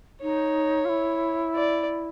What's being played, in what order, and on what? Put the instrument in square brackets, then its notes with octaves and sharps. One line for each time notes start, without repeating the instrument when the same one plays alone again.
[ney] D#4 [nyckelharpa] C#5
[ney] F4
E4
[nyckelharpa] D5